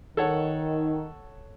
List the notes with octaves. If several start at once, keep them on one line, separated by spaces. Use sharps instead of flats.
D#3 A4 C#5 F#5